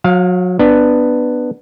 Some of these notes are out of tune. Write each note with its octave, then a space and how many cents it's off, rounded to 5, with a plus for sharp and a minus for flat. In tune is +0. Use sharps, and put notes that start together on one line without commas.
F#3 -30 F5 +15
B3 +0 D4 +15